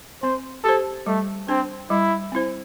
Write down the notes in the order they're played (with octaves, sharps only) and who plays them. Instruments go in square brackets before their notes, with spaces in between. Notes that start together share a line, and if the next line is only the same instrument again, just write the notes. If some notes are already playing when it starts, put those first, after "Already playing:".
[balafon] C4 [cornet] C5
[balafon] G4 C5 [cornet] A4
[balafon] G3 [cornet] A3
[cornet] C4 [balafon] D4 C5
[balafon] G3 [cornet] E4
[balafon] C4 E4 C5